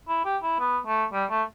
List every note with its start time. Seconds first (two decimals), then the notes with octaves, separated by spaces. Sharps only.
0.08 E4
0.25 G4
0.42 E4
0.59 B3
0.86 A3
1.13 G3
1.30 A3